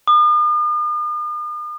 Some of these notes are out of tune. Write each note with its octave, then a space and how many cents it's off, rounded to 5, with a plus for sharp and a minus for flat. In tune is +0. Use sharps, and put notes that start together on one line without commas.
D#6 -45